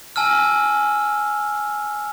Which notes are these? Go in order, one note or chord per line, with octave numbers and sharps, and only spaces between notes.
G#5 A5 E6 F6